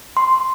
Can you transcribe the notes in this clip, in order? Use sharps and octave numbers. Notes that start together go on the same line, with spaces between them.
C6